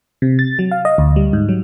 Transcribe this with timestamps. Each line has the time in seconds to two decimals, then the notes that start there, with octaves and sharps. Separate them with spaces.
0.22 C3
0.39 A6
0.59 F#3
0.71 F5
0.85 D#5
0.98 D2
1.16 G3
1.33 G#2
1.49 F#3